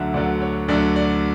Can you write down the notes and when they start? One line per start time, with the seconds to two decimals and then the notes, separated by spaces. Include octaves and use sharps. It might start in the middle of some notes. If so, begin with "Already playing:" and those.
Already playing: D2 D3 F#3 E5 F#5
0.14 D2 D3 F#3 D5
0.42 C#5
0.68 D2 D3 F#3 D5
0.96 D5